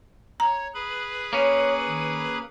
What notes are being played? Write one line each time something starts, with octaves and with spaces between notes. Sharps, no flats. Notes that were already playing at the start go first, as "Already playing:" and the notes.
C#5 A#5
G#4 B4 B5
A#3 C#4 C#5
D#3